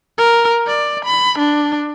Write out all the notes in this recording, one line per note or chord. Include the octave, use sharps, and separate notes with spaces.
A#4
D5
B5
D4